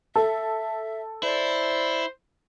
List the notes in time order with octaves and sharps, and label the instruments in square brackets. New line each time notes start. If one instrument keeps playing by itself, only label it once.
[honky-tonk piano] A4 [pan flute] E5
[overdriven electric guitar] E4 [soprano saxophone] C5 [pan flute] D5